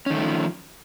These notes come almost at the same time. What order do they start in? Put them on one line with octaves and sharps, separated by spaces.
C#4 D#3 A3 G3 F3